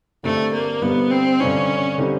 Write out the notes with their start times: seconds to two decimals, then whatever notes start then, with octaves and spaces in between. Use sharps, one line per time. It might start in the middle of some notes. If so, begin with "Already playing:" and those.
0.23 G2 D3 G3 A3 C4 D#4
0.53 A#3
0.81 G2 D3 G3 B3 C4 D#4
1.10 C4
1.40 G2 D3 G3 C4 C#4 D#4
1.98 D3 G3 C4 D#4